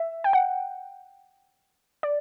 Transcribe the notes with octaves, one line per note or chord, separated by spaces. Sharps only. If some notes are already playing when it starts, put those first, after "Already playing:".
Already playing: E5
G5
F#5
D5